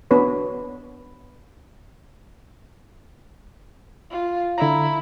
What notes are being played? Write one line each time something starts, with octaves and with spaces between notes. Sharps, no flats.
B3 D4 F#4 B4 C#5
F4
D3 E4 A#5